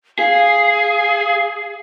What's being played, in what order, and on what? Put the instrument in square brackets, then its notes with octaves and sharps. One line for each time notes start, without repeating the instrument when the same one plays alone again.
[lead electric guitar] G#4 [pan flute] F5